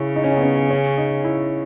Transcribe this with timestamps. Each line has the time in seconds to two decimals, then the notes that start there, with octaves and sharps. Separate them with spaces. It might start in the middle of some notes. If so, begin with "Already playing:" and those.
Already playing: C#3 C#4 E4
0.16 D#4
0.24 C#4
0.32 D#4
0.37 B3
0.43 C#4
0.70 C#4
0.98 D#4
1.24 E4